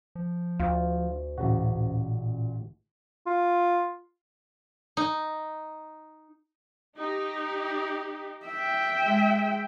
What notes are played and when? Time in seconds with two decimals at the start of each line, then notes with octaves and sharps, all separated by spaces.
0.15 F3
0.60 D2 F4
1.38 A1 A#2 C#3 F#4
3.26 F4
4.97 D#4
6.97 D#4 G4
8.46 E5 G5
9.04 G#3